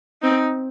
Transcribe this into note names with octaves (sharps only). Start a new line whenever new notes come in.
C4 D#4